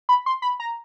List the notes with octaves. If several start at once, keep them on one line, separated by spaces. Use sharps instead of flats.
B5
C6
B5
A#5